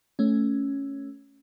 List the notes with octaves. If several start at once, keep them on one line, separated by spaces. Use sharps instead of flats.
A3 C#4